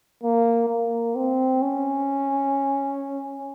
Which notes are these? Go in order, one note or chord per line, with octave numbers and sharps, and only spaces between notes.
A#3
A#3
C4
C#4